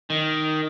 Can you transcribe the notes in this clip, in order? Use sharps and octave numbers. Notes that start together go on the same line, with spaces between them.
D#3